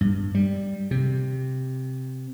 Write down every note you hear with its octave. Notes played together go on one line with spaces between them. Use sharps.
G2
G3
C3